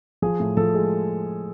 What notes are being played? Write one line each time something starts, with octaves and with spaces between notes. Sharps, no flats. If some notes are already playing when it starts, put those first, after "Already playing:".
F3 G#4
A2
F3 A4
G#3